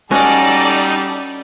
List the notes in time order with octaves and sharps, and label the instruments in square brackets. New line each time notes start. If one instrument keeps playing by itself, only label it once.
[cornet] G3 [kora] C#4 F#4 [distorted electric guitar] D#4 [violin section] A4 D5